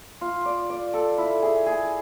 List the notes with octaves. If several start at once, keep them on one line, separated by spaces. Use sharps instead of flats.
F4
D5
D5
A4
E4
G#4
G#4